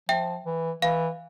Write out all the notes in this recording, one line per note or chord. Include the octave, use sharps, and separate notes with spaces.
F3 E5 G5
E3
E3 F5